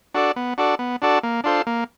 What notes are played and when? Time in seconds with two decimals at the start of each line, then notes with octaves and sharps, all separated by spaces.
0.14 D4 F#4 A4 D5
0.36 B3
0.58 D4 F#4 A4 D5
0.79 B3
1.02 D4 F#4 A4 D5
1.23 A#3
1.44 D4 F4 A4 C5
1.67 A#3